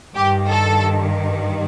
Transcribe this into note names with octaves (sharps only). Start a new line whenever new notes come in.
G2 D#3 G4
A4